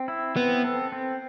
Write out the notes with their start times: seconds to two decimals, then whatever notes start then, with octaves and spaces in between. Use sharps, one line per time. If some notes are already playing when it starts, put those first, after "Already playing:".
Already playing: C4
0.08 E4
0.36 B3 C4
0.64 A4
0.92 C4